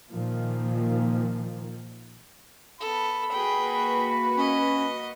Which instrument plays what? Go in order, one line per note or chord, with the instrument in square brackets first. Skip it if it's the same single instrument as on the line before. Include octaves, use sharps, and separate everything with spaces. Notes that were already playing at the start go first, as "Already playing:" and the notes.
[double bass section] A#2 D#3 F3 A#3
[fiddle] B3 A4 [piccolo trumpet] B5
[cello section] A#3 F#4 B4 [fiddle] G#4 G5
[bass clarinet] C#4 [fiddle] D#5